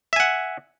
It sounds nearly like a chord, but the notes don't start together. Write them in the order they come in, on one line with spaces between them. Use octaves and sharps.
E5 G#5 F#5